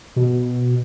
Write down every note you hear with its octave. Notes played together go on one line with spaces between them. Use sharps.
B2